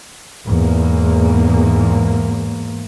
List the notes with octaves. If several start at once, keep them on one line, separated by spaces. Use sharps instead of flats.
E2 G#2 A#3